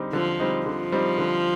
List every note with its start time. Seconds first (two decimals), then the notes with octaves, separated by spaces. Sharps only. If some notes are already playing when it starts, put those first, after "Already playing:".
Already playing: D3 G3 C4 D#4
0.13 D3 F3
0.40 G3 C4 D#4
0.66 D3 F3
0.92 G3 C4 D#4
1.18 D3